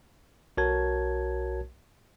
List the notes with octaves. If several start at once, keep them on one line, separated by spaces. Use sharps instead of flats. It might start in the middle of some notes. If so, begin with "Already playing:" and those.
B1 F#4 A#4 C#5 A5 G#6